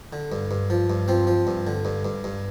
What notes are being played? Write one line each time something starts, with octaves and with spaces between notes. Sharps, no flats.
D3
G2
G2
F3
G2
F3 C4
F3
G2
D3
G2
G2
G2